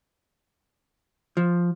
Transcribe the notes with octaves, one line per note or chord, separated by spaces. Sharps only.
F3